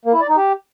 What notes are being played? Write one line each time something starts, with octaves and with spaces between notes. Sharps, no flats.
A#3
E4
D5
D#4
G4